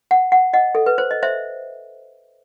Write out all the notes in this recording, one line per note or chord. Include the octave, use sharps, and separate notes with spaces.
F#5
F#5
D#5 F#5
A4
B4
C5
D#5
C5 E5